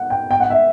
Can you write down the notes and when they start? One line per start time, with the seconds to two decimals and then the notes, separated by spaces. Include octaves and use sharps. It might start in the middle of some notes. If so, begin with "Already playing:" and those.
Already playing: F#5
0.10 G5
0.31 G5
0.40 F#5
0.50 E5